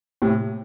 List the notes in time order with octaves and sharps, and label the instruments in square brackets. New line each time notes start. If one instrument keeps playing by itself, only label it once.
[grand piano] A2 C3